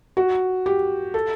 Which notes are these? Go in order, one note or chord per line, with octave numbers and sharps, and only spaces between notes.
F#4
G4
A4